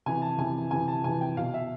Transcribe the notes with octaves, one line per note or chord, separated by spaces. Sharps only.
C3 E3 G#5
A5
C3 E3 G#5
C3 E3 G#5
A5
C3 E3 G#5
G5
B2 F5
E5